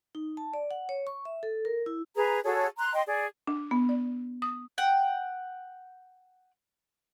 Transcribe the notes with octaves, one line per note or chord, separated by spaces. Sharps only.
D#4
A5
D5
F#5
C#5
C#6
E5
A4
A#4
E4
G#4 B4 A#5
F#4 G#4 A4 C#5
A#5 C6 F#6
D#5 G5 C6
G#4 D5
D4
B3
D5
D#6
F#5 G5